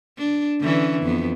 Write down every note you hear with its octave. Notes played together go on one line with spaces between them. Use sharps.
D4
D3 E3 C#4
F2 B3